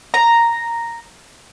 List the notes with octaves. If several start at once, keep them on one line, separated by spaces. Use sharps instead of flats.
A#5